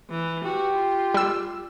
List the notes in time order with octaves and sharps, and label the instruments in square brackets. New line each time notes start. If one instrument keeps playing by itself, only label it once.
[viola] E3
[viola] F#4 [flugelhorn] G4
[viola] F4
[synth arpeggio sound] G3 E6